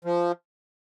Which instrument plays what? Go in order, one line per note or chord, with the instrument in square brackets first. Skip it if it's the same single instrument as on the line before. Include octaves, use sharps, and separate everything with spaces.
[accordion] F3